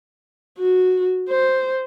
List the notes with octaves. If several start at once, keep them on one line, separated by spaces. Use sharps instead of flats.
F#4
C5